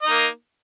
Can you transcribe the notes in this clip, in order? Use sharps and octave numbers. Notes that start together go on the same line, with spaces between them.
A#3 D#4 D#5